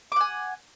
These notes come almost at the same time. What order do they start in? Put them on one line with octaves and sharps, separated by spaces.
D6 F#5 G#5